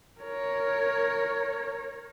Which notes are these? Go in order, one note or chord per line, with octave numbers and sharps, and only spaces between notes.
A#4 C#5